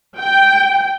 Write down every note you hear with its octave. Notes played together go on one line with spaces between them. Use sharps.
G5